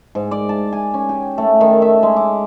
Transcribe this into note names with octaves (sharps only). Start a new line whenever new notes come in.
G#2
D5
A5
G#5
C#4
G4
A3
D#3
E5
G#3
D6